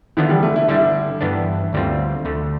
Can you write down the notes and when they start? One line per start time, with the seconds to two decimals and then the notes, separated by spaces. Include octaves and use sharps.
0.17 D3 E3 F3 B3 D4
0.29 G3
0.43 A3
0.56 E4
0.68 D3 G3 D4 E4
1.21 G2 E3 B3 D4
1.73 D2 D3 G3 C4 F4
2.25 D2 D3 A3